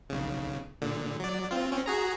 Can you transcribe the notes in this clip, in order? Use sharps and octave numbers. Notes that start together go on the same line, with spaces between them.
B1 C#3
A#2 D3
F#3 D5
C4 F4
C4 C#4
F#4 G#4 A#5